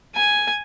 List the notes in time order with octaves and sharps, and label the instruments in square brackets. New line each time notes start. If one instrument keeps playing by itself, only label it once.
[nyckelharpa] G#5